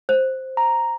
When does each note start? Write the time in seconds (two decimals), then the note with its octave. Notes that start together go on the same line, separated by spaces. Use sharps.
0.09 C5
0.57 A#5